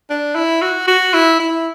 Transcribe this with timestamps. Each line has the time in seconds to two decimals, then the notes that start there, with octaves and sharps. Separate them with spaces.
0.10 D4
0.35 E4
0.62 F#4
0.88 F#4
1.14 E4
1.39 E4